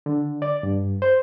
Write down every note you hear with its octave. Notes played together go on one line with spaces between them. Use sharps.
D3
D5
G2
C5